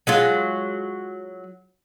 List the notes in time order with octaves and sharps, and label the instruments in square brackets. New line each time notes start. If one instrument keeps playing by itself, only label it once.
[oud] F#3 G#3 F4